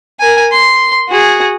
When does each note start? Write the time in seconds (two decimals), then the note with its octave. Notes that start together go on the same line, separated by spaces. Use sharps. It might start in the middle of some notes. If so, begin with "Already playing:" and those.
0.20 A#4 G#5
0.52 C6
1.09 F#4 G#4